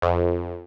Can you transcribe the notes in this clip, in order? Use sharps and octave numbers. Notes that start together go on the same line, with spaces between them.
F2